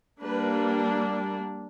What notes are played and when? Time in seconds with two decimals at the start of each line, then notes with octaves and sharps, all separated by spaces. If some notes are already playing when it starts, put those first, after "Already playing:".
0.21 G3 A#3 D4 B4